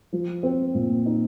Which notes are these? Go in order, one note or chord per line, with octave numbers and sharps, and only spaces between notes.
F3
C4
A#2
D#4